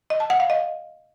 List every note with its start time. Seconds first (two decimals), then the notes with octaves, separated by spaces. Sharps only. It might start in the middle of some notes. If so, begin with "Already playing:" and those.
0.10 D#5
0.20 A5
0.30 F#5
0.40 F5
0.50 D#5